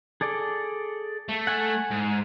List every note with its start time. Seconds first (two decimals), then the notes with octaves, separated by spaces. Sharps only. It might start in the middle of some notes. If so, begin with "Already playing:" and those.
0.21 G#4 A4 D5
1.29 A3
1.47 F#5 G#5
1.91 G#2